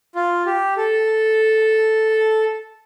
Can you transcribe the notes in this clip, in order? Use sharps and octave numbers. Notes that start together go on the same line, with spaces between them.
F4
G4
A4